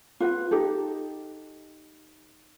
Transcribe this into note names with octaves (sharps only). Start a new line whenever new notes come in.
F4 B4 F#5
D#4 G4 A4